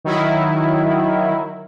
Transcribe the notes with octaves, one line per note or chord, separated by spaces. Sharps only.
D#3 F#3 E4